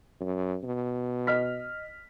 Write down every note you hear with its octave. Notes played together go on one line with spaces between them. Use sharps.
F#2
B2
D#5 F6 B6